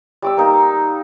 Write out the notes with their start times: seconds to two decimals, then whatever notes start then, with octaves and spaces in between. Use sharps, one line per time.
0.22 G3 D6 E6
0.37 A#3 D#4